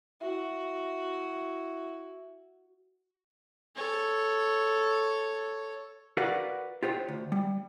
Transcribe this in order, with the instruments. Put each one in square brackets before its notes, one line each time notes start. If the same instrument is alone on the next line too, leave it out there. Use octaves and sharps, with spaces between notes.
[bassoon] E4 [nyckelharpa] F#4
[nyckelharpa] A4 C#5
[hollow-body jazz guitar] F#4 A#4 B4 D5 F5 F#5
F4 G4 C5 C#5
D2
G3